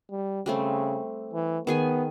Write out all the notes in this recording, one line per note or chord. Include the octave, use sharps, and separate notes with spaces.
G3
C#3 G3 A3 C4
E3
D#3 B3 G#4 G#5